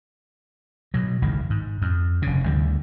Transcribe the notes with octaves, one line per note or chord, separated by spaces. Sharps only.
B2 F#3
G#1 C#2 F#2 D#3
G#2
F2
F1 C#3
D2 D3 D#3 G3